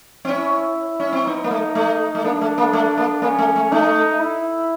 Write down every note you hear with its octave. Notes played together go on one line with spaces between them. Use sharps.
C4
C#4 E4
C#4
C4
B3 D#4
A#3
A3
A3
A3
A#3 D4
A3
A#3
A3
A#3
A#3 C#4
A3
A3
A3 D#4
E4